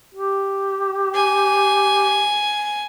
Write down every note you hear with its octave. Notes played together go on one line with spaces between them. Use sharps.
G4
G#5